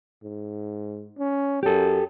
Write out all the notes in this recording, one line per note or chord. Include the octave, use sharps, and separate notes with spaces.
G#2
C#4
F#2 G4 A4